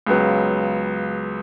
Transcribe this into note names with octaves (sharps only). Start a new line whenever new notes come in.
C#2 C#3 F#3 B3